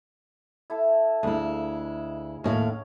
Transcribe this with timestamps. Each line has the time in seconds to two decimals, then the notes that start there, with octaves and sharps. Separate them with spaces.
0.70 E4 A4
1.23 D2 G#3 E4 F5
2.44 D#2 A2 C#4 F5